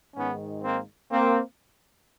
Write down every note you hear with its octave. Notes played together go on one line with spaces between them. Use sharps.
G#2 D#3 G#3 B3 C#4
A#3 C4
A#3 C4